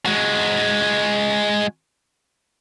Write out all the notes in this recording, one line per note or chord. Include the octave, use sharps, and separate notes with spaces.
G#3 F#4